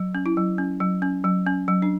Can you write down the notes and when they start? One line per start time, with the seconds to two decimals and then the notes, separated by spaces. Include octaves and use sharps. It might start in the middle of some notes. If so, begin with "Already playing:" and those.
Already playing: F#3
0.15 C#4
0.26 E4
0.37 F#3
0.58 C#4
0.80 F#3
1.02 C#4
1.24 F#3
1.47 C#4
1.68 F#3
1.82 D4